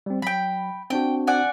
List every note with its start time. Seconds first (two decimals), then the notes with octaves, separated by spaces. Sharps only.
0.06 G3 C4
0.22 F#3 G5 B5
0.90 C4 D4 F#4 G5
1.27 D5 F#5 G#5